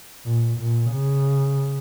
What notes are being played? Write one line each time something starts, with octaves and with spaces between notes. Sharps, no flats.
A#2
A#2
C#3